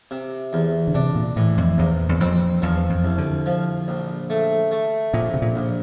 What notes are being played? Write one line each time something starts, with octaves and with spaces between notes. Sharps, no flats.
C3
E2
D3
C3 D4
A#2
A2 E3
F2
A#1 E2
E2
F2 C4
E2 F3
F2
C2
D3
F3
A#1
A3
A3
A#1 A#2
C3
A#2
A#1